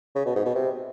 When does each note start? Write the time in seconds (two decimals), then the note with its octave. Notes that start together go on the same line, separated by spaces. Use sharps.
0.15 C#3
0.25 B2
0.35 G#2
0.45 B2
0.55 C3